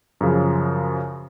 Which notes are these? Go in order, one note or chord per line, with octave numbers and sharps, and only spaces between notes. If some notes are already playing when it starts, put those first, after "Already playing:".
F#2 C#3 F3